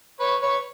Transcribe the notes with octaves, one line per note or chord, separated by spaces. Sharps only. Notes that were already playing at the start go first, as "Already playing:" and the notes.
B4 C#5
B4 C#5